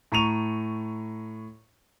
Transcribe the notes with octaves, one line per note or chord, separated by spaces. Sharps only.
A2 A#5 C#6 D#7 F7